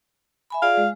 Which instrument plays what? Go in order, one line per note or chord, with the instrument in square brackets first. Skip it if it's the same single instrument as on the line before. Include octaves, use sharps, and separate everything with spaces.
[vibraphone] E5 G#5 B5
[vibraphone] F4 G#4 D5 [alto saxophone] F5
[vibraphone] G#3